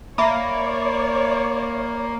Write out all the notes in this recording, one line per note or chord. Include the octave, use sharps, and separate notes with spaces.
A#3 C#5 D5 E5 B5